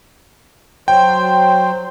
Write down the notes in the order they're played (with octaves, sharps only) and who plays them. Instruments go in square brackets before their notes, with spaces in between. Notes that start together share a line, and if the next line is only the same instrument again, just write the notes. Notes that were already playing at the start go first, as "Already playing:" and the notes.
[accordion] F#3 C5 [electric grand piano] G5